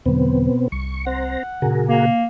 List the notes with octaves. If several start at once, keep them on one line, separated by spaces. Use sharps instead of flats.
E2 B2 D3 F#3 B3 C4
C2 C#6
C4 C5 F#5 A#5
A#2 C#3 F#4 G#4 A#4
A#3